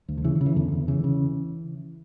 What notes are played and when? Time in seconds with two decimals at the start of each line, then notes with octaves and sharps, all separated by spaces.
0.08 D2
0.18 D3
0.24 C#3 E3
0.35 E3
0.41 C#3
0.46 E3
0.56 E2 D3
0.72 E2
0.88 C#3 E3
1.04 C#3